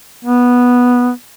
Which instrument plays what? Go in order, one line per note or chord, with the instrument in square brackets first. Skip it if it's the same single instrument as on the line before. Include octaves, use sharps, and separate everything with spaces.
[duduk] B3